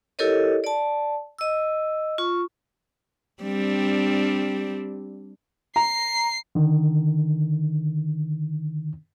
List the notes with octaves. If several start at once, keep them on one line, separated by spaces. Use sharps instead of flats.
E4 G4 A4 A#4 C#5 D#5
D5 A5
D#5 E6
F4 C#6
G3 C4 D4
A#5 C7
D3 D#3